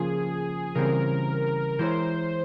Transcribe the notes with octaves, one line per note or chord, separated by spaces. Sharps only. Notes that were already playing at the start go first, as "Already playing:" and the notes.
Already playing: C#3 F3 A#3 F4 G#4
C#3 E3 G3 C4 A#4
E3 G#3 E4 A#4 C5 C#5